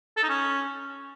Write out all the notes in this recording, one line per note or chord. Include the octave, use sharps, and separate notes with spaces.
A4
D#4
C#4